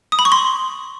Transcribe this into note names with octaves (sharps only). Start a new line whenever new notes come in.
D#6
B5
C#6
C6